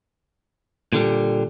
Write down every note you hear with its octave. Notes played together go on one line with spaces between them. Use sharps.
A#2 D3 G3